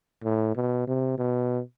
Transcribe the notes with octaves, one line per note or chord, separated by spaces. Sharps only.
A2
B2
C3
B2